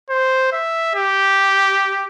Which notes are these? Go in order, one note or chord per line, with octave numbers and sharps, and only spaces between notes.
C5
E5
G4